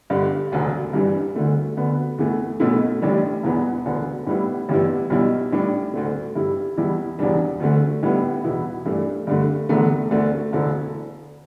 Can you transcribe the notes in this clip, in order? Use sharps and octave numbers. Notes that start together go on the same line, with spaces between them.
G1 G2 D3
E1 D2 D3
G2 E3 G3 D4
D2 D3 A3
D2 D3 B3
E2 E3 A3
B1 B2 A3 E4
A1 A2 G3 D4
E1 E2 E3 B3
E1 D2 D3 B3
A2 G3 B3 E4
A1 G2 G3 B3 E4
B1 B2 G3 E4
A2 G3 D4
D2 D3 A3
G2 G3 E4
E2 E3 G3 E4
E1 E2 E3 G3 D4
D2 D3 A3
A2 G3 B3 E4
E2 B2 B3 E4
G2 E3 A3 D4
G2 D3 A3
E1 E2 D3 A3
D2 D3 A3 D4
E1 D2 D3 A3 E4